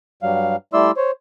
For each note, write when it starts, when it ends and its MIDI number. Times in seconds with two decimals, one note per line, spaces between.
0.23 0.56 43
0.23 0.56 54
0.23 0.56 55
0.23 0.56 77
0.73 0.91 55
0.73 0.91 57
0.73 0.91 64
0.73 0.91 74
0.73 0.91 84
0.73 0.91 88
0.97 1.11 72
0.97 1.11 73